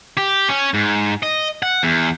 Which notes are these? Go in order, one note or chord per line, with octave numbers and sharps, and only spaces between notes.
G4
C#4
G#2
D#5
F#5
E2